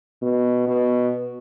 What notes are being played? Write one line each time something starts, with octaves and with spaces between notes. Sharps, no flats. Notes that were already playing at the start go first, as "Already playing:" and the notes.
B2
B2